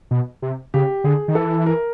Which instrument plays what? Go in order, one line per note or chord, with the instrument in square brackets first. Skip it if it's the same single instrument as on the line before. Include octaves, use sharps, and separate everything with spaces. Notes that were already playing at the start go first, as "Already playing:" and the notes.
[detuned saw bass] B2
C3
[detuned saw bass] C#3 [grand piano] G4
[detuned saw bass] D3 [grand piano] G#4
[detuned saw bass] D#3
[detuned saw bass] E3 [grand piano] A4
[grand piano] A#4